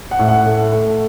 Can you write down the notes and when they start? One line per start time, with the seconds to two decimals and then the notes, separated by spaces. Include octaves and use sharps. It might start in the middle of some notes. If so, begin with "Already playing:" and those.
0.11 F#5
0.19 A2
0.28 F#5
0.46 A3
0.72 A3